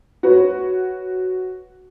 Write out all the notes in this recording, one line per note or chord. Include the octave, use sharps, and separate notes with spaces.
F#4 B4 C#5